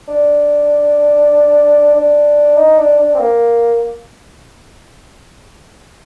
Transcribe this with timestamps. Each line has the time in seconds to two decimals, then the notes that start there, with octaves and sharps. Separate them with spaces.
0.08 D4
1.94 D4
2.57 D#4
2.78 D4
2.99 D4
3.14 C4
3.19 A#3